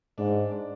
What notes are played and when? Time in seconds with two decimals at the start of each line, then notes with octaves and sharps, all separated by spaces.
0.18 G#2 D4
0.51 D4